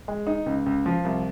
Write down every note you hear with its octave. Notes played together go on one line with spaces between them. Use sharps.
G#3
D#4
C#2
C#2
F3
C2